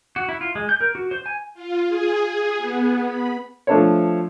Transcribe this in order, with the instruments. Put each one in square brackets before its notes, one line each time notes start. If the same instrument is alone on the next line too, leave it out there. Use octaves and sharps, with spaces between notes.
[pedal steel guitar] F#4
E4
F4
G#3
G6
A#4
F#4
C5
G#5
[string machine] F4
G#4
G#4
B3
B5
[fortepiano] F3 A3 D4 A4 C5 C#5